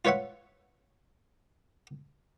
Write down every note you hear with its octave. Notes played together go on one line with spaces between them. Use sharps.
F4 B4 C#5 E5 F#5